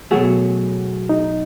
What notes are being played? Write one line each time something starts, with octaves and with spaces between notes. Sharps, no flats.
B2 F#3 A3 F#4 G#4
D#4